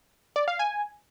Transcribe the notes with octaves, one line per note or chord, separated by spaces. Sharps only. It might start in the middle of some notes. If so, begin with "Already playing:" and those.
D5
F5
G#5